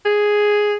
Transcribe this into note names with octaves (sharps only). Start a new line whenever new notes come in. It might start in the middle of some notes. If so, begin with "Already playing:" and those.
G#4